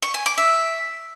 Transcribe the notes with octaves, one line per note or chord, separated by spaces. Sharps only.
C#6
G#5
D6
E5